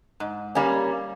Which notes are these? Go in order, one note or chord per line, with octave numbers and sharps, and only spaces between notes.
G#2
G3 A#3 C#4